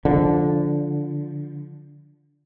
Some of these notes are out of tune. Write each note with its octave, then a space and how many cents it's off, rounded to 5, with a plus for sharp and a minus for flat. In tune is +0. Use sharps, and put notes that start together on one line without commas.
D3 -10 F3 +0